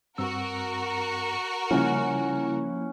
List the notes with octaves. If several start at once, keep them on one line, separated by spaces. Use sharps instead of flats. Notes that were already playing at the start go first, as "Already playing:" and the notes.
G2 C4 F#4 A#4 E6
C#3 F3 G3 A#3 C#4 E4 F#5 F6